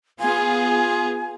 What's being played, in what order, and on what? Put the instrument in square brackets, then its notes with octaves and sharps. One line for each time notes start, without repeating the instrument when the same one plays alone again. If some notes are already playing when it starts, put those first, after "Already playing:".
[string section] B3 F4 G#4 [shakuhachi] G#5